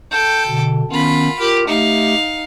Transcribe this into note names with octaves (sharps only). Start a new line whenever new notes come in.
A4 G5 G6
B2 D3
D#3 B3 C#4 F4 B5
F4 G4 A#4
A3 D#4 G4 E5 F5